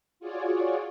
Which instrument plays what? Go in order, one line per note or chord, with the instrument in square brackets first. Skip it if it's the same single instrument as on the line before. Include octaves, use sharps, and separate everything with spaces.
[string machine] F4 F#4 G#4 C#5 D5